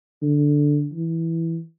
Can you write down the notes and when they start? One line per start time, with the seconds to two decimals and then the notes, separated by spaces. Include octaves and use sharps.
0.22 D3
0.93 E3